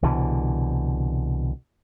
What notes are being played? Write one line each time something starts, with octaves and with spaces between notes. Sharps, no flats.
C2 B2 D3 E3